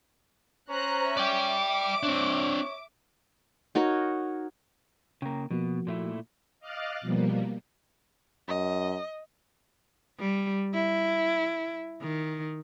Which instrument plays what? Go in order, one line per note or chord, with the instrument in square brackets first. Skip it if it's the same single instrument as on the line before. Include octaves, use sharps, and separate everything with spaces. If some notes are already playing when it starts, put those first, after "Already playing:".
[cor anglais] C#4 [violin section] C5 A#5 F#6
[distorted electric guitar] D5 G5 [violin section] E5 D6
[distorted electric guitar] C4 D4 [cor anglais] C#5
[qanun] D#4 F#4 A#4 C#5
[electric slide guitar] C#3 A#3 [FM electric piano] G5 A#5
[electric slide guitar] B2 [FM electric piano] F3 A#3 F#4
[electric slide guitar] A#2 A3 E4
[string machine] D#5 F5 D6 F6 F#6 A6
B2 F3 G3 A#3
[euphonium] F#2 [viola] D#5
[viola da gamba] G3
E4
D#3